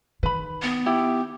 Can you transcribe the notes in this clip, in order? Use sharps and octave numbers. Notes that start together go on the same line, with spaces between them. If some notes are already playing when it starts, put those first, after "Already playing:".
D#3 B4 B5
B3
E4 G4